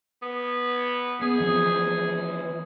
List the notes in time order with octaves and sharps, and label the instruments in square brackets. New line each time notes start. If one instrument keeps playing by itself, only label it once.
[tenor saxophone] B3
[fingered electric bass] B3 [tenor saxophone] G#4
[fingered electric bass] E3 F3 C4